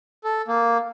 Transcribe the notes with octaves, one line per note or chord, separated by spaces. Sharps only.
A4
A#3